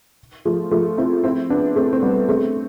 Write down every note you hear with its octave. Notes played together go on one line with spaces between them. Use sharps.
F3 A3
F3 A3
C4 E4
C4 E4
B3 D4
A3 C4
C4
G3 B3
A3 C4